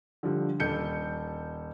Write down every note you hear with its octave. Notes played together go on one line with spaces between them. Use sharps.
D3 F3 G3
D#1 A4 G6 C#7